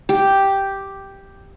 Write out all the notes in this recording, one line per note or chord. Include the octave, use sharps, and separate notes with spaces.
G4